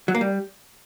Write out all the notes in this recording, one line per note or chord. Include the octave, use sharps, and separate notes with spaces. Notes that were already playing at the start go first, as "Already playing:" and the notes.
F#3
A#3
G3